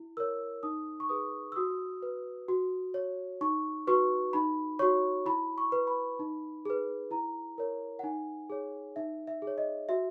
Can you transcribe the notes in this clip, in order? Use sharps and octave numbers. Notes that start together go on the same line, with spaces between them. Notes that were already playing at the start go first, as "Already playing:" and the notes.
Already playing: E4
A#4 C#5 E6
D#4 D#6
C#6
G#4 B4 D#6
E6
F#4 D#6
B4
F#4
C#5
D#4 C#6
F#4 B4 C#6
D#4 B5
F#4 C#5 C#6
E4 B5
C#6
B4
B5
D#4
G#4 B4
E4 A#5
A#4 C#5
F#5
D#4 G#5
G#4 C#5
D#4 E5
E5
G#4
C#5
D#5
F#4 E5